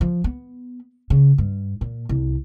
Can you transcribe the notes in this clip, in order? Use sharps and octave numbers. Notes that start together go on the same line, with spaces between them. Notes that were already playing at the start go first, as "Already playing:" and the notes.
F3
B3
C#3
G2
A#2
C2